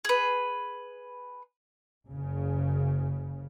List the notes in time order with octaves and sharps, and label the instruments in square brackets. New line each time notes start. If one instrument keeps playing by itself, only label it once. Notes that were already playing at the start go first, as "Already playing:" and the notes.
[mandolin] G#4 B4
[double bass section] F#1 C#3